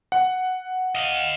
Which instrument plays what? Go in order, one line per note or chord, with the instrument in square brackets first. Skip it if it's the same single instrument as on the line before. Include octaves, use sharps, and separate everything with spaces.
[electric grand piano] F#5
[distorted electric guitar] D#5 F5